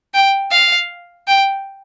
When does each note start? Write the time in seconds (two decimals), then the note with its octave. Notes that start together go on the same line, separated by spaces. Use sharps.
0.14 G5
0.51 F5
1.27 G5